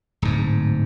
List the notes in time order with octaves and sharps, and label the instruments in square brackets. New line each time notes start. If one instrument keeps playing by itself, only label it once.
[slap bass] D1 G#2